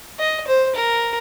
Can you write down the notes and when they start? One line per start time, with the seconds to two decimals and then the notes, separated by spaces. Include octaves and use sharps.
0.19 D#5
0.47 C5
0.76 A#4